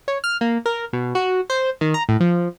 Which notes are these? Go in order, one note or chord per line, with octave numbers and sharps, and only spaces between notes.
C#5
F6
A#3
A#4
B2
F#4
C5
D#3
A#5
A2
F3